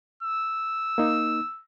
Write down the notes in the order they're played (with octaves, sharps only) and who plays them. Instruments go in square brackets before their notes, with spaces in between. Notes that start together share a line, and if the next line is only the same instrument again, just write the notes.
[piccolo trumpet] E6
[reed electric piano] A#3 D#4